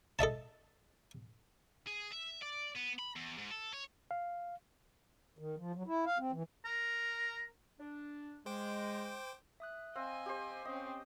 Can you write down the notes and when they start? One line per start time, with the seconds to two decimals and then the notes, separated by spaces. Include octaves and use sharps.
0.19 A4 D#5 E5 A5
1.87 G#4
2.12 E5
2.43 D5
2.76 B3
2.99 B5
3.16 E2
3.38 G#2
3.51 A4
3.73 C#5
4.11 F5
5.39 D#3
5.58 F3
5.75 F#3
5.87 E4
6.06 F5
6.19 C4
6.32 E3
6.65 A#4
7.80 D4
8.46 G#3 C5 G5 D6
9.60 E5 D#6 F#6
9.96 C4 D#5 F5 G#5 E6
10.26 G4 C5
10.65 C4 C#4 D#5